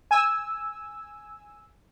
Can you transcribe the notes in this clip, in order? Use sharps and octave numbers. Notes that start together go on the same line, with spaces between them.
G#5 E6